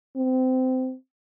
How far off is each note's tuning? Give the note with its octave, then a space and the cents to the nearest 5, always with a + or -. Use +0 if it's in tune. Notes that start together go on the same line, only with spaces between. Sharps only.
C4 -25